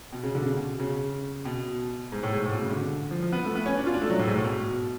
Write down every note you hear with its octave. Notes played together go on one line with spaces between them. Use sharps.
B2
C#3
D3
C#3
B2
C#3
B2
G#2
A2
G#2
A2
B2
C#3
D3
F3
F3
B3
A3
B3
C#4
D4
F4
D4
A3
F#3
A2
G#2
A2
B2